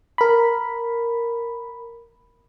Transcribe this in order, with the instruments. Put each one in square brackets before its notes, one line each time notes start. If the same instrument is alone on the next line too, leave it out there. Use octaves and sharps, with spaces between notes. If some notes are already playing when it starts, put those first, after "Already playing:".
[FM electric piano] A#4 B5